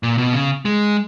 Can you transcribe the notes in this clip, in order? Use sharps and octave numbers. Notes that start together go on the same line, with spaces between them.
A#2
B2
C#3
G#3